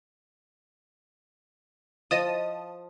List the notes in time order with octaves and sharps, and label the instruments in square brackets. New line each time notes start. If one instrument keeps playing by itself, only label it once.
[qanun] F3 [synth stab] D#5 A5 D#6